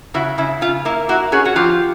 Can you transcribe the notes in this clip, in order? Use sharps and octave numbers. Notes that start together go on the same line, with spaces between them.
C#3 E4 F#4
C#3 E4
C#3 F4
A#3 E4
A#3 E4 F#4
C#4 F#4 G#4
F#4
F3 F4 G4